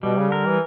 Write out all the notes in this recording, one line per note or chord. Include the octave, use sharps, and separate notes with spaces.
B2 G3
C#3
D3 A#4
E3